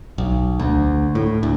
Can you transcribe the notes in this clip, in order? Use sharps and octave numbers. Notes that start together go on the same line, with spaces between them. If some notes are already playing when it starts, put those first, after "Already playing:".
B1
D2
A2
D2